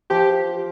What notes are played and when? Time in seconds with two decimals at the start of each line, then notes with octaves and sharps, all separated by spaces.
0.10 F3 G4